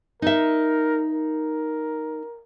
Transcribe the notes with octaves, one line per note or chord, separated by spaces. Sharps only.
D#4 A#4 E5
A#4